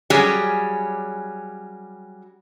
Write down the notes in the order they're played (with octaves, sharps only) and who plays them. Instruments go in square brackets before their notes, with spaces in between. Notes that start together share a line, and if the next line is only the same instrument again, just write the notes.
[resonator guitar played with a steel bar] F#3 G3 C#4 G4 G#4